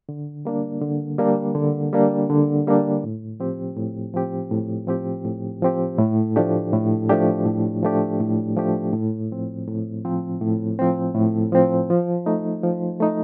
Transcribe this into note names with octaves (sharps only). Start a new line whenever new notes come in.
D3
G3 A#3 D4
D3
G3 A#3 D4
D3
G3 A#3 D4
D3
G3 A#3 D4
A2
F3 C4 G4
A2
F3 C4 G4
A2
F3 C4 G4
A2
F3 C4 G4
A2
F3 A3 D4 G4
A2
F3 A3 D4 G4
A2
F3 A3 D4 G4
A2
F3 A3 D4 G4
A2
F3 C4
A2
F3 C4
A2
F3 C4
A2
F3 C4
F3
A3 D#4
F3
A3 D#4